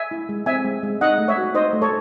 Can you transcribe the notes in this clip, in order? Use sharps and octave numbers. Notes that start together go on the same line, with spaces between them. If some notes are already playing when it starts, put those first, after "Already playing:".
Already playing: E5 G#5
E4
G#3
C4 E5 G#5
G#3
G#3
D#4 D#5 F#5
A3
C#5 E5
F#4
D#4 C5 D#5
A3
A4 C#5